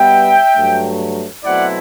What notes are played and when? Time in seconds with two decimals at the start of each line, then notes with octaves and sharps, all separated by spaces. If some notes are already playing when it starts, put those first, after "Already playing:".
Already playing: B2 G3 B3 E5 G5
0.56 G2 F#3 A3
1.44 B2 F#3 A3 C4 E4 D5 F#5